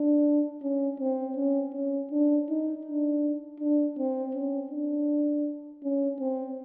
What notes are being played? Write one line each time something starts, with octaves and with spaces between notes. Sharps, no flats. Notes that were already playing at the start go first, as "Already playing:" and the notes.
Already playing: D4
C#4
C4
C#4
C#4
D4
D#4
D4
D4
C4
C#4
D4
C#4
C4